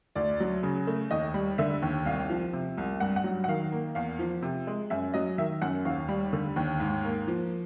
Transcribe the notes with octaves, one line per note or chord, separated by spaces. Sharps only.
D2 D5
F#3
C#3
A3
D#2 D#5
G3
D3 E5
D#2
C2 F5
F3
C3
C2
G2 F#5
F#5
F#3
F#5
D#3 F5
A#3
E2 F5
F3
C3
G#3
F#2 E5
F#3 D#5
D#3 E5
F#2 F#5
D#2 F5
G3
D3
D#2
G#2
A#3
F3